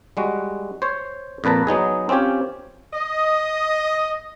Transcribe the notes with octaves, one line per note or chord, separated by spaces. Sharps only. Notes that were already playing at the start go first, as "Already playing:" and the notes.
G3 G#3 F#4
C5 C#5
F2 A#2 B4 A5 A#5
F#3 B3 D#4 G#4
C4 C#4 F4 G4 C#5
D#5